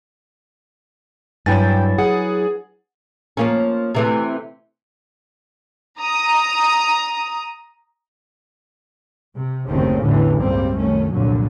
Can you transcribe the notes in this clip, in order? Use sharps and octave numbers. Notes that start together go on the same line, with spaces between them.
G2 F#3 E4 G5 G#5 A6
G#4 F#5
F3 A#3 C#4
C3 E3 A3
A#5 D#6
C3
F#1 D#2 D#3 A3 C4 C#4
A1 E2 A2 D3 E3
C#2 G2 G3 A#3 C4
C2 F#2 D#3 A3 C#4
C2 F2 A#2 D3 F#3